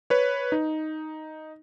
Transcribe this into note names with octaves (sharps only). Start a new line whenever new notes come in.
B4 C#5
D#4